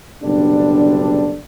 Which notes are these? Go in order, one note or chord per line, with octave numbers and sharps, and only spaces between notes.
F#1 B2 D3 G3 D4